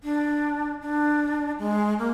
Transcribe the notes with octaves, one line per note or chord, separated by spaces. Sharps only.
D4
D4
G#3
A#3